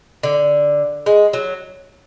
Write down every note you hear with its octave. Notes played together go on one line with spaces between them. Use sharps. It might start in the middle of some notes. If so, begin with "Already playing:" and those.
D3
G#3
F#3